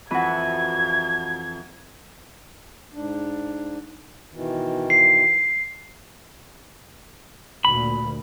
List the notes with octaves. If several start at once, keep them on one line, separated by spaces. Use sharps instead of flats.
F2 E3 F#4 B4 E5 G#6
G#2 D4
B2 D#3 E3
C7
D2 A#2 B5